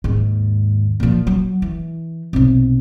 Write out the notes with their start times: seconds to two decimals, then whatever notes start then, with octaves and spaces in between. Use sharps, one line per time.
0.04 D#2 G#2
1.00 A#2 F3
1.27 F#3
1.62 E3
2.33 B1 C3